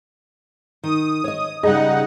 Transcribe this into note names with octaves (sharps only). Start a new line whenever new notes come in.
D#3 D#6
C#5 D#5
C#3 G3 D#4 G#4 D#5 F#5